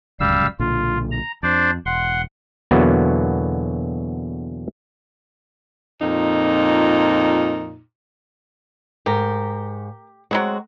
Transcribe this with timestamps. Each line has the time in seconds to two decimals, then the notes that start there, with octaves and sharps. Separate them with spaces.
0.20 D1 C#2 F#2 G3 F5 E6
0.60 B1 A#2 D3 F4
1.11 A#5
1.43 F2 D4 C5 D5
1.86 E1 F#5 C6
2.71 E2 B2 D3 F#3 A#3 B3
6.01 F2 A#2 D#4
9.06 G#2 G4 A#4
10.31 F#3 G#3 C4 F#4